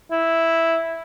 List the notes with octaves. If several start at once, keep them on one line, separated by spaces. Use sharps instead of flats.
E4